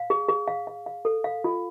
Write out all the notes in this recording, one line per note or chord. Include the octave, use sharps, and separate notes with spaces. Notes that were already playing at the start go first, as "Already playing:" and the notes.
Already playing: F5
G#4
G#4
F5
F5
F5
A4
F5
F4